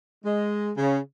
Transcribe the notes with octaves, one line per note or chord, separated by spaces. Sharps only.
G#3
C#3